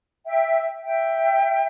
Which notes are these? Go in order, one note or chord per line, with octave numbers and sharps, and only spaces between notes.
E5 G5
E5 G5